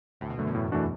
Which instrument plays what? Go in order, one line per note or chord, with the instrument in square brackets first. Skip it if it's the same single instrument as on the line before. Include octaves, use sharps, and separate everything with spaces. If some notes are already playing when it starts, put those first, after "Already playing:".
[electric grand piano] D2 [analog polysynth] A2
[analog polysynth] B2
[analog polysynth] F#2 [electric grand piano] D3 A3
[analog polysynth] E2
[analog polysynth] F#2 [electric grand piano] A2
[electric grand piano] E3 A3 D4 F#4